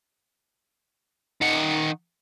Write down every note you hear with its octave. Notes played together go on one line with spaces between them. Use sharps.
D#3 F#5